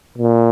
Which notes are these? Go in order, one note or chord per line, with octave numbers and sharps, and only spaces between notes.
A#2